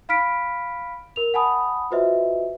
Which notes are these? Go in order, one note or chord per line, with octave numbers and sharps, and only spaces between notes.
F5 B5 F6 B6 D7
A#4 F7
F#5 G#5 A5 B5 D#6
F4 F#4 B4 C5 D#5 E5